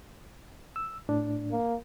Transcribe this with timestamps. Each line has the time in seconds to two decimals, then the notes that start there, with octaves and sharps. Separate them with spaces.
0.76 E6
1.09 A2 D4
1.52 A#3